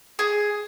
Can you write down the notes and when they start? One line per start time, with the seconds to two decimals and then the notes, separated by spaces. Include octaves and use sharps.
0.19 G#4